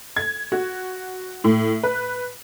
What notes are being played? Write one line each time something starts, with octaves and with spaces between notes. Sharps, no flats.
G#6
F#4
A2
B4